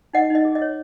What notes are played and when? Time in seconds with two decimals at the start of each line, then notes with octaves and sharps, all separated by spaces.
0.13 D#4 D#5 F#5
0.30 D#4 D#5
0.45 G#4
0.55 D#5
0.62 C#5